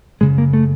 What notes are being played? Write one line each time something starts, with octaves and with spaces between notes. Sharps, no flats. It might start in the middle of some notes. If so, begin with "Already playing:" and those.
F#2 C#3 G#3
A#3
A3